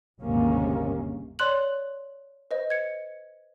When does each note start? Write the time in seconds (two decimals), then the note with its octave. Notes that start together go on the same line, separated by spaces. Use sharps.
0.20 G1 D#2 G#2 C3 A#3 C#4
1.39 C#5 D5 C6 F#6 F#7
2.51 B4 C5 D#5
2.70 G#6 C#7